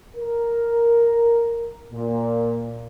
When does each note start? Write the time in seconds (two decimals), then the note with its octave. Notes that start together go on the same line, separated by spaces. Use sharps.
0.16 A#4
1.93 A#2